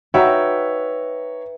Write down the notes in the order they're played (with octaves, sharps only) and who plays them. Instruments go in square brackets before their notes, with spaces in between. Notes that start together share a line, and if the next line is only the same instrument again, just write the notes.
[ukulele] D#4 F#4 [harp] B4 E5 G5 [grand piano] C#5 A#5